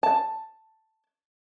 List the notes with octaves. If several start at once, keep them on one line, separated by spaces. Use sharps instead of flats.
A5